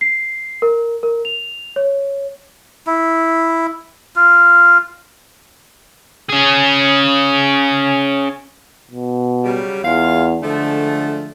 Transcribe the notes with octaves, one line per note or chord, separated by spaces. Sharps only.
C7
A#4
A#4
F7
C#5
E4
F4
C#4 G#4
B2
C#3 F#3 G3
E2 G#3 F4 F5
D3 F3 G#3 A3